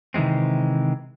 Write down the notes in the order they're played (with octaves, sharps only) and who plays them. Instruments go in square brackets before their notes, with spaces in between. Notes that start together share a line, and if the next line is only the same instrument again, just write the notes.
[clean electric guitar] C3 D#3 E3 G#3 C4